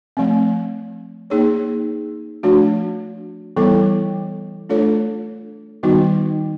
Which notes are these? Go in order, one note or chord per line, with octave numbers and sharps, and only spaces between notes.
F3 A3 C4
A#3 D#4 G#4 C#5
F3 A3 D4 F#4
E3 G3 B3 E4 A4
A3 D4 F4 A4 C#5
D#3 G3 B3 D#4 F#4